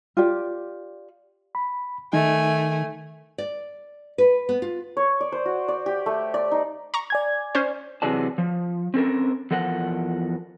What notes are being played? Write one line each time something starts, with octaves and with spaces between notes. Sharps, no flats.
F4 G4 D5
B5
D#3 A3 D#4 G#5
D5
B4
B3
F4
C#5
D5
C5
F#4
D5
G4
A3
D5
D#4
A#5 C#6
D5 G#5 G#6
C#4 C5
C3 E3 F#3 G#4 D5 A5
F3
C4 C#4 A4 A#4
E2 F3 A4 A#4 F#5